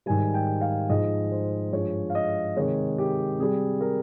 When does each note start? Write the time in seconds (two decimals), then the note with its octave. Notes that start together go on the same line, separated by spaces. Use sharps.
0.06 G#2 D#3 G3 G#5
0.34 G5
0.61 F5
0.89 G#2 F3 G#3 D#5
1.32 C5
1.72 G2 F3 G#3 C#5
2.10 F5
2.15 D#5
2.56 C3 D#3 G#3 C#5
2.98 G4
3.39 C3 G3 G#4
3.81 A#4